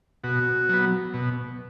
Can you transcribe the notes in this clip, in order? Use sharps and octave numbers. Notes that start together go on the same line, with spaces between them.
B2 F#4
F#3 B3
B2